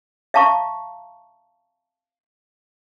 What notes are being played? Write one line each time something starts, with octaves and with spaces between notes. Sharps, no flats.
E5 F5 A5 A#5 C#6